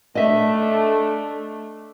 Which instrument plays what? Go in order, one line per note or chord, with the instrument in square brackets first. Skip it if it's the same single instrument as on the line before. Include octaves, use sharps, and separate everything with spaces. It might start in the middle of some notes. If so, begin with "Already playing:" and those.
[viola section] A3 D4 [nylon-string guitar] D#5 E5